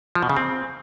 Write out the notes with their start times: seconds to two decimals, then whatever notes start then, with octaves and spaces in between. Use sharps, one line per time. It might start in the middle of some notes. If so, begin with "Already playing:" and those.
0.15 F3
0.22 B2
0.29 C#3
0.37 C4